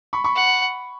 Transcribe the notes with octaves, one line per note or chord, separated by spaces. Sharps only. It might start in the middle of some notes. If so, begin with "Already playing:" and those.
B5 C#6
B5 C#6
F#5